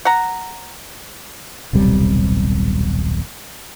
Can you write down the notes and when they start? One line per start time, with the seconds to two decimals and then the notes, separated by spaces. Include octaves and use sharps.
0.05 F#5 A#5
1.73 D#1 B1 C3 G3